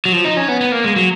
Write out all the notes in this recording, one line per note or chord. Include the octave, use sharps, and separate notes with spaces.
F#3
F3
D#4
C#4
B3
B3
A#3
G#3
F#3